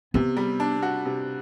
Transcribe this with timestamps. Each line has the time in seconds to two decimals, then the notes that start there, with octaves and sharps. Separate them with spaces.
0.14 C3 B3
0.37 G3
0.60 D4
0.82 F#4
1.05 C3